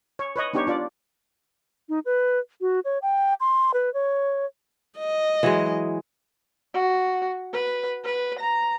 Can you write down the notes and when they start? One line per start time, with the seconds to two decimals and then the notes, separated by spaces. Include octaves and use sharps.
0.19 C#5
0.36 B4 C#5 D#5
0.53 B3 D4 D#4 G4 C#5
0.67 D4 F4 D5
1.89 D#4
2.06 B4
2.61 F#4
2.85 C#5
3.02 G5
3.40 C6
3.74 B4
3.94 C#5
4.98 D#5
5.43 E3 F#3 G#3
6.74 F#4
7.53 B4
8.04 B4
8.39 A#5